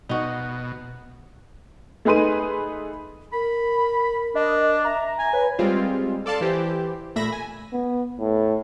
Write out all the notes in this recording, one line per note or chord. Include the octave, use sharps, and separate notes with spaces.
B2 D#4 F#4
A3 D#4 G#4 B4 C6 D#7
A#4 B5
D4 D#5
E5 A#5
G#5
B4 C#5
G3 G#3 C4 F4
A4 D5 F5 A5 C6
E3 G4 C5
A#2 A3 E5 B5 A#6
G#5
B3
A2